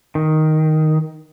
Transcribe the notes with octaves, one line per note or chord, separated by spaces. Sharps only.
D#3